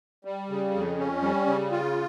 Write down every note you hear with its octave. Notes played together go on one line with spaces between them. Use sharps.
G3
C#3
F2
C#4
G3
C#3
F4